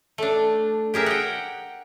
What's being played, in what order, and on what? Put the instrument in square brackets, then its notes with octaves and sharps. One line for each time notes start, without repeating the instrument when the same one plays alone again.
[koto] A3 D4
G4 G#4 A#4 E5
F#5 G5